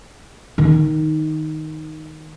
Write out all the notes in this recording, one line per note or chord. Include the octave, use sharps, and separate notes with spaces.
D#3 D#4